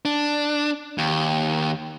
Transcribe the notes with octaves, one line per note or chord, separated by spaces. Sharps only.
D4
D#2